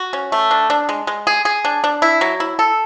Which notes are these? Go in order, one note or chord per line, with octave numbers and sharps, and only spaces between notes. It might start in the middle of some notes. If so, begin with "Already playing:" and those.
Already playing: F#4
C#4
A3
D4
D4
G#3
G#3
G#4
G#4
D4
D4
E4
F#3
E4
A4